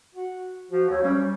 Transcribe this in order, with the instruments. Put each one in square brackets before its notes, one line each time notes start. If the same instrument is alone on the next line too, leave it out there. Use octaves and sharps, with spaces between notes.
[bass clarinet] F#4
[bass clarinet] F3 [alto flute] F#4
[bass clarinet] D#2 [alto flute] C#5
[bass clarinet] G3 [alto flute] C#4